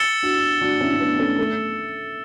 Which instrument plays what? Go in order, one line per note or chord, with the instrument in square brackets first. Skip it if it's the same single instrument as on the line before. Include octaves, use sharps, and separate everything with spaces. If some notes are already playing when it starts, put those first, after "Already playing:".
Already playing: [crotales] E6 A6 C#7 E7 G7
[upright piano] D4 F#4
D4 F#4
C#4 E4
C#4
B3 D4
A3 C#4
A3